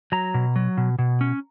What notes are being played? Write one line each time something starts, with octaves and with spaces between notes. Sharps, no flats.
F#3 A#5
B2
F#3
B2
B2
C#4